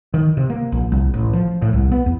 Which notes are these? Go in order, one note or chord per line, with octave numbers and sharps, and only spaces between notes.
D#3
C3
A#3
A#1
C2
A1
F3
A2
C2
B3
E2